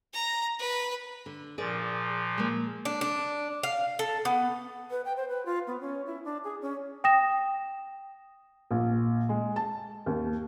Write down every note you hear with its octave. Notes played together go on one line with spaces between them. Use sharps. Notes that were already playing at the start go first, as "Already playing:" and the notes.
A#5
B4
D3
A#2 F3 G#4 A#4 D5
G#3 A#3
D4
D4
F5
A4
B3
B4
G5
C5
B4
F4
B3
C#4
E4
D4
G#4
C#4
G5 D#6 A#6 E7
A#1
G#3
A5
D#2